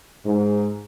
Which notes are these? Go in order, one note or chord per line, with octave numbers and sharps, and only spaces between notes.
G#2